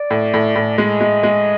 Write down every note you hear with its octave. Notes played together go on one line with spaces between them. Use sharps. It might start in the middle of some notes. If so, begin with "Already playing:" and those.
Already playing: D5
A2
A2
A2
G#3 D#5
G#3
G#3